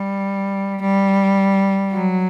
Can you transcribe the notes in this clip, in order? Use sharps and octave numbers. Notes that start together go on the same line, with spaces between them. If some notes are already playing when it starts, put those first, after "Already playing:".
Already playing: G3
G3
F#3